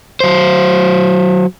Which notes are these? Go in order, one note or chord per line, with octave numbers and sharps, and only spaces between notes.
F#3 C5